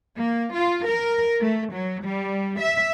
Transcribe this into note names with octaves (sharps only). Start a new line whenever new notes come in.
A#3
F4
A#4
A3
F#3
G3
E5